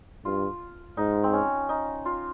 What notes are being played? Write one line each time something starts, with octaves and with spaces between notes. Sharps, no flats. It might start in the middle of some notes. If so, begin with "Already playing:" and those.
G2 F4
G#2 D#4
C4
C#4
D#4
F4